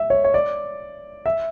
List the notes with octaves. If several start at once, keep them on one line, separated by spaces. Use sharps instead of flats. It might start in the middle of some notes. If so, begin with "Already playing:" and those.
Already playing: E5
C#5
C#5
D5
E5